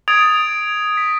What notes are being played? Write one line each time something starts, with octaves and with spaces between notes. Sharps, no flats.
D#6 G#6 A6 D7 F7
B6